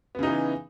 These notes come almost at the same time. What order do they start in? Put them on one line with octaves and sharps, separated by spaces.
B3 C#3 D#4 E3